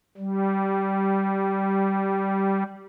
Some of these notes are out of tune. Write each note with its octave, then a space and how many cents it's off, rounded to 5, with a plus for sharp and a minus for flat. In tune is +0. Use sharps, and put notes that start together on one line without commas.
G3 -15